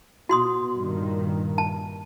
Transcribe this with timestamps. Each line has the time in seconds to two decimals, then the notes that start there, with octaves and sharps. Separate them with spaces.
0.29 B2 F#4 C6 D#6
0.77 G2 A#2 D#3
1.58 A5